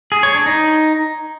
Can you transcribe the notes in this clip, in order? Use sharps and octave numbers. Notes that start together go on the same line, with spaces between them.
G#4
C#5
D4
D#4